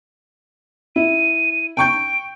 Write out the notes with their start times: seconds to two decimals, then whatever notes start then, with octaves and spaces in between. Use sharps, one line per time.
0.96 E4 D#7
1.77 G5 C#6 G6 D7